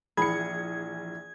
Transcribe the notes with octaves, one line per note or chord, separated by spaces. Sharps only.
A#1 E3 G#4 B5 G#6 C#7